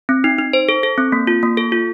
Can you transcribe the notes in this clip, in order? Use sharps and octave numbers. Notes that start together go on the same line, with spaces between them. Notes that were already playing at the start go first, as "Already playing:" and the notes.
C4
D#4
D#4
C5
A4
A4
C4
A#3
F4
A#3
A4
F4